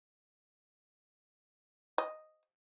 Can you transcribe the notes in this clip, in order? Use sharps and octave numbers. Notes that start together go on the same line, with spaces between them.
D#5